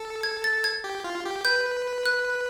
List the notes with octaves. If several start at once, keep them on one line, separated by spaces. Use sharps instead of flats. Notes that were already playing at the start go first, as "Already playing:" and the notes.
Already playing: A4
G#6
A6
G#6
G4
F4
G4
B4 G6
F#6